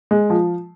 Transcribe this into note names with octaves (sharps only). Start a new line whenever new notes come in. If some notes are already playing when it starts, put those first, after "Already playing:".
G#3
F3